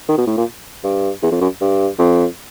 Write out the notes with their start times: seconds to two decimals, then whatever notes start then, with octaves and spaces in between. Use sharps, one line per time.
0.08 D#3
0.17 B2
0.26 A2
0.37 A#2
0.84 G2
1.23 E2
1.31 F2
1.41 F#2
1.61 G2
1.99 F2